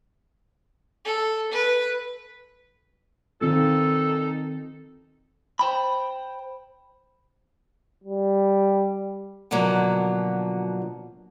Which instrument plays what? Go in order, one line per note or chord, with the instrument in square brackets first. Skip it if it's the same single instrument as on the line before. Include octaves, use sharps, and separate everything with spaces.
[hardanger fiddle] A4
B4
[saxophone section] A#2 D#4 A4 [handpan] D#3 C4 F4
[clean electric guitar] C5 G5 B5
[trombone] G3
[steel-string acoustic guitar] B2 D3 F3 F#3 A#3